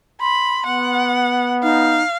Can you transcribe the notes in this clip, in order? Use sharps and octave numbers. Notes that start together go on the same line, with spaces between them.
B5 C6
B3 F#5
D#4 F5